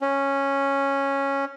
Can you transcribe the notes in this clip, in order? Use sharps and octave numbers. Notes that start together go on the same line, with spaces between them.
C#4